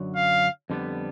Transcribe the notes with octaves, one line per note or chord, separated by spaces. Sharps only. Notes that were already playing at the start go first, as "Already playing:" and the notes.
Already playing: F#2 D3 F#3
F5
F2 D3 G3 B3